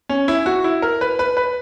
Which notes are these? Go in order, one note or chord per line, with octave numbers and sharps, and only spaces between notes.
C#4
E4
F#4
E4
A#4
B4
B4
B4